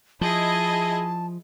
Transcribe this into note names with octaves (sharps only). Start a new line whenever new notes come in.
F3 E4 G#4 D#5 A5